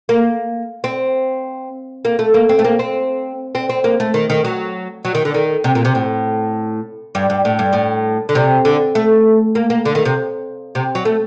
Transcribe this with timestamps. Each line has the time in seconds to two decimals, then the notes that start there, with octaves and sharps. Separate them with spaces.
0.09 A#3
0.84 C4
2.05 A#3
2.19 A3
2.34 A#3
2.49 C4
2.59 A3
2.64 A#3
2.79 C4
3.55 C4
3.69 C4
3.84 A#3
4.00 A3
4.14 D#3
4.30 D#3
4.44 F#3
5.05 F#3
5.15 D#3
5.25 D3
5.34 D#3
5.64 C3
5.75 A#2
5.85 C3
5.95 A2
7.15 G2
7.30 G2
7.45 A2
7.59 G2
7.73 A2
8.29 D3
8.35 C3
8.65 D3
8.95 A3
9.55 A#3
9.70 A#3
9.85 D3
9.95 D#3
10.05 C3
10.75 C3
10.95 F#3
11.05 A3